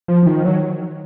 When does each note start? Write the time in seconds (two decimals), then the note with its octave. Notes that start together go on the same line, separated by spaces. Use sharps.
0.08 F3
0.23 F3
0.26 D#3
0.45 F#3